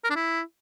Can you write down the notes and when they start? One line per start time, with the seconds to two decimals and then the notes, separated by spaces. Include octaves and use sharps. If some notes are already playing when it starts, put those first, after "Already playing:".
0.04 A#4
0.10 D4
0.16 E4